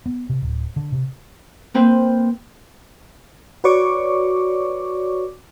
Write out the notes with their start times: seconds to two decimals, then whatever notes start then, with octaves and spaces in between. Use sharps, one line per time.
0.06 B3
0.29 C3
0.42 D1
0.76 D3
0.92 C3
1.74 A#3 C4 B4 C5
3.64 F#4 B4 C#5 D5 C#6 D6